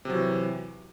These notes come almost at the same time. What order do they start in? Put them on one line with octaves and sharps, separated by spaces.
C3 F#3 E3